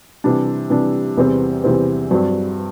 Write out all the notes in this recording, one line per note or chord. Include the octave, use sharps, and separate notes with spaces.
C3 E3 G3 D4
C3 E3 G3 D4
E2 C3 E3 G3 C4
E2 C3 E3 G3 C4
G2 F#3 C4